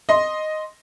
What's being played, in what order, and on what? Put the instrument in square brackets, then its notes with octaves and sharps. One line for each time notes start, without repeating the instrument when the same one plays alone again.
[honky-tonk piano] D#5 C6